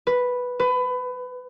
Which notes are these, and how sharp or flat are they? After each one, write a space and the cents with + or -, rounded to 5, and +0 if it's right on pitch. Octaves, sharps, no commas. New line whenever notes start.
B4 +0
B4 +25